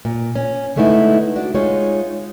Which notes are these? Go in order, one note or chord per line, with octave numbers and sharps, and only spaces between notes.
A#2
C#4
D3 G#3 A3 B3 D#4 E4
D4 F#4
G#3 D#4 F4 C#5